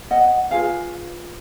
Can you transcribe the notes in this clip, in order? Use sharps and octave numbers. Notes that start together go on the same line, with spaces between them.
D#5 F#5
F4 G#4 B4 F5 G#5